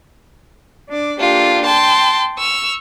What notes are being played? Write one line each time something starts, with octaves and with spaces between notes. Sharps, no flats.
D4 D5
A#3 D4 F4 G4 A4
G5 A5 C6
C#6 E6 F6